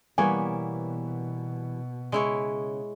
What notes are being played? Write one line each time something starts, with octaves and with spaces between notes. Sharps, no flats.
B2 E3 G3 A#3 B3 C#5 G#5
C#3 G#3 E4 C#5